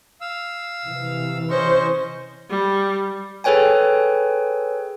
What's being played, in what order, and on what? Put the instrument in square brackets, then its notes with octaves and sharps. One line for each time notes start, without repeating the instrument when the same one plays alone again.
[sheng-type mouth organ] F5 E6
[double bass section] C3 E3
[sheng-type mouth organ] C#4 D#5 C#6 [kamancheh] C5
[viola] G3
[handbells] G#4 A4 B4 C#5 G5 G#5